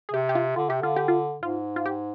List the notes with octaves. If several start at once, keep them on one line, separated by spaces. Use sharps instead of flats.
G#4
C3 G4
G4
F4
D3 F4
C3 G4
D3 F4
G4
F4
G#2 F4
F4
G4